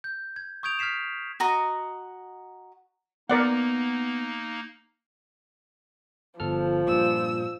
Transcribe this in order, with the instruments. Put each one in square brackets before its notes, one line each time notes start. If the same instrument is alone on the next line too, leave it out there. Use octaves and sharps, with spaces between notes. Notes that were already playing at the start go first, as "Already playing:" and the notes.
[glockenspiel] G6
G#6
C#6 D#6 G6 G#6 D7 F7
F6 G#6 B6 C7 E7
[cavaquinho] F#4 D#5 A#5 D#6
[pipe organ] A#3 D#4 [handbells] B3 [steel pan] A#4 D5 F#5
[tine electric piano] G1 A4 F6 [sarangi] F3
[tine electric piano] G2 A#2 [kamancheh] E6